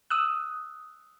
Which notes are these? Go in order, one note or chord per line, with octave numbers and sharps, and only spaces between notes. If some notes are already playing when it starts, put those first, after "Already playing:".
D#6 E6 F#6